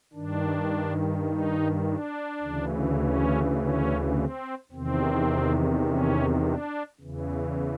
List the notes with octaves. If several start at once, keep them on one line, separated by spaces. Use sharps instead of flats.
G2 D#3 D4
D#4
D4
D2 C#3 E3
C#4
C#4
C4
E2 C3 D#3 C4
C#4
D4
E2 C#3 E3